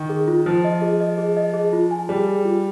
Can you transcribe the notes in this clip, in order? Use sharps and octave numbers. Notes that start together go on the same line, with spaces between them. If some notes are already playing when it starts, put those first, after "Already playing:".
Already playing: D#3
G#4
F4
F3 F4
D#5
G#4
D#5
G#4
D#5
G#4
F4
G#5
G3 G#4
G#4
F4